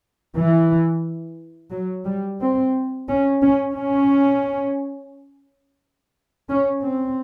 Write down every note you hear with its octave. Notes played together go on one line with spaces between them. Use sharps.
E3
F#3
G3
C4
C#4
C#4
C#4
C#4
C4